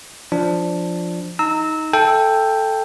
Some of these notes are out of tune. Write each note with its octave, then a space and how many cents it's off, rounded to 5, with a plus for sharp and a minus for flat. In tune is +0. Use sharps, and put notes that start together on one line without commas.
F3 +0 D4 +0
D#4 +15 A#5 -20 E6 -20
A4 +0 E5 +0 G5 +10